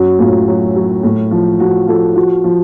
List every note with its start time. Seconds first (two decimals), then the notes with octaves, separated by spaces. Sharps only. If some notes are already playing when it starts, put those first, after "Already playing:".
Already playing: F#2 F#3 F#4
0.19 A2 F4
0.48 F#3
0.76 F#3
1.03 A2
1.31 F3
1.60 F3 F#4
1.88 F3 A4
2.16 F3 F#4
2.44 F3